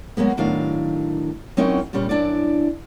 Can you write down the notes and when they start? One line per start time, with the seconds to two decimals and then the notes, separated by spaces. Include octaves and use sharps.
0.17 F#3 G#3 A#3 B3
0.37 A2 D#3 F#3 D4 F5
1.57 F#3 C4 C#4 D#4 E4 A#4
1.93 A#2 C#3 G3 C#4
2.09 F#2 D4 E4 D5